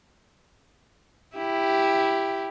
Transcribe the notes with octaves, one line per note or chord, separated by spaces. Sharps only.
E4 G4